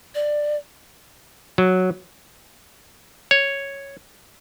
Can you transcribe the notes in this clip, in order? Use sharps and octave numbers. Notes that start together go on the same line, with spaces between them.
D5
F#3
C#5